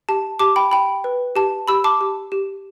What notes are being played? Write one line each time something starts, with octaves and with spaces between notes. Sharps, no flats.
G4 A5
G4 A5 D6
G5 B5
G5 B5
B4
G4 A5
G4 B5 E6
A5 D6
G4
G4